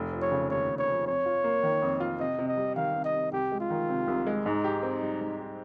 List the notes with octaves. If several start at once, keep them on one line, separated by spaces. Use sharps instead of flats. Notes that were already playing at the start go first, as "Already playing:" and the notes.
Already playing: F1
F3
C#5
C#3
D#2 C#5
F1
C#5
F3
F2 C#5
F4
A#3
D#3
F2
F4
C3 D#5
C3
D#5
G3
D#3 F5
C3
D#5
C3
C2 G4
G#3
F4
D#3
C3
C2
G#3
G#2 D#4
G4
C4
G3
G#2
G4